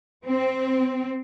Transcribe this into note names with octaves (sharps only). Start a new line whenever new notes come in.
C4